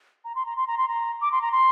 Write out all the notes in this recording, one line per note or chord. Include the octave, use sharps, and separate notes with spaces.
A#5
C6
A#5
C6
A#5
C6
A#5
D6
C6
A#5
C6